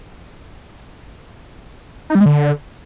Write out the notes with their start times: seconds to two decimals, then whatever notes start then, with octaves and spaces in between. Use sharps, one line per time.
2.10 D#4
2.15 G3
2.20 G#3
2.26 D3